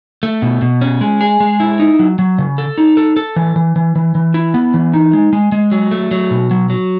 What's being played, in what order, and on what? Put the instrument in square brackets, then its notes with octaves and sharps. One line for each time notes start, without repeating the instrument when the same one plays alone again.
[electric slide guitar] A3
B2
B2
C#4
G#3
G#4
G#3
E4
D#4
F#3
F#3
C#3
A4
D#4
A4
A4
E3
E3
E3
E3
E3
E4
B3
E3
D#4
G#3
G#3
G#3
F#3
A3
F#3
B2
F#3
F#3